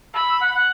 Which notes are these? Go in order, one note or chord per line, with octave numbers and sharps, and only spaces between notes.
B5 E6
E6
F#5
F#5